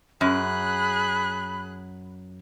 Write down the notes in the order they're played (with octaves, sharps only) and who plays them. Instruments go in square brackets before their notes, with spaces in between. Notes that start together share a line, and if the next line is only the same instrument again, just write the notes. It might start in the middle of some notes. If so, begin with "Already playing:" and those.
[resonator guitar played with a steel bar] F#2 [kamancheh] G#4 F#6 [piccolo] B5